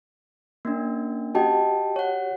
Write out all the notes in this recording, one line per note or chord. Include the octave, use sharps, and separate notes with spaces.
A#3 C#4 D4
F#4 G4 D#5 G5 A5
C#5 F#5